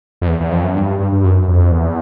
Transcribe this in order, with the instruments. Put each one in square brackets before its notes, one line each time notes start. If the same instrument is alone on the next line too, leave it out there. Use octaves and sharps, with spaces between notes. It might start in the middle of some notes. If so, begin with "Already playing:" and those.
[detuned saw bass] F2
E2
E2
F2
F#2
G2
G2
G2
F#2
F2
E2